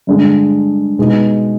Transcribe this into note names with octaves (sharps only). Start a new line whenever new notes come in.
G2 D3 G#3
B2 G#3 B3 D#4